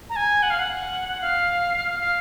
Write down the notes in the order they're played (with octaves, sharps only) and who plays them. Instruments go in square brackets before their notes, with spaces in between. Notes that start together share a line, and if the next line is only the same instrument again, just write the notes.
[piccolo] A#5
G#5
F#5
F5
F#5
F5
F5